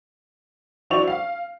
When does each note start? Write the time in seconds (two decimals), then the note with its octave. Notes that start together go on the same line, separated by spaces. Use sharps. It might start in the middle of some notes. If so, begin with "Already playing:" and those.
0.90 F#3 D4 E4 C5 C#6 F7
1.07 F5